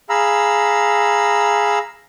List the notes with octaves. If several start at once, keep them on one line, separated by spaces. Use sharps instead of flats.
G#4 F5 A#5 B5 E6